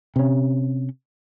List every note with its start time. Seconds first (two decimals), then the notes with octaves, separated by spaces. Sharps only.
0.16 C3 C#4